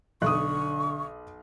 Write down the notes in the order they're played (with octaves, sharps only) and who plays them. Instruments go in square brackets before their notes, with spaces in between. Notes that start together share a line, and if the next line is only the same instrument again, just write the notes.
[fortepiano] B1 [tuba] D3 [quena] C#6 [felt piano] D#6 F#6